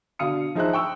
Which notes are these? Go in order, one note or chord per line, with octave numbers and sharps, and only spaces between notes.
B2 D3 F5 D#6 C#7
F3 D#4 G#4 C5 E5 F#6
G5 C#6 E6